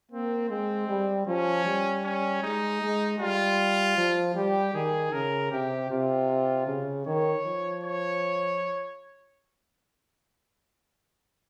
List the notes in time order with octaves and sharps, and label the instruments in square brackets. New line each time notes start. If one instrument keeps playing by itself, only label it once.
[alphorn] A#3 [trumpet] C4
[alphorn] G#3 [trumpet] C4
[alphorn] G3
[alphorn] F3 [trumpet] C#4
[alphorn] G3
[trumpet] C#4
[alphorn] G#3 [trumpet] D#4
[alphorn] G#3
[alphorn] G3 [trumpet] F4
[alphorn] F3
[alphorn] G3 [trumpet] G4
[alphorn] D#3 [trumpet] G#4
[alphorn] C#3 [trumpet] A#4
[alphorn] C3 [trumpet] G4
[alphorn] C3 [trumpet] F4
[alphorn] C#3
[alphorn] D#3 [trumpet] C#5
[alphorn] F3
[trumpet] C#5